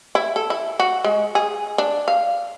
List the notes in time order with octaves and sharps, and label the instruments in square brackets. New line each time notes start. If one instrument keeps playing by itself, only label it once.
[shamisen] E4
A4
E4
F#4
G#3
G#4
D4
F5